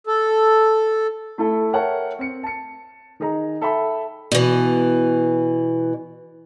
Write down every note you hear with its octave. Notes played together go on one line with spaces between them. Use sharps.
A4
A3 E4 A4
A#4 C#5 E5 F#5 G5 A5
C4 C#7
A5 C#7
D#3 D#4 G#4 A#5
A4 E5 G5 B5
B2 E3